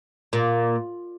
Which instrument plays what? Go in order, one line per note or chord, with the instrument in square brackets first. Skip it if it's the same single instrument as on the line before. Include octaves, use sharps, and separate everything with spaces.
[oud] A#2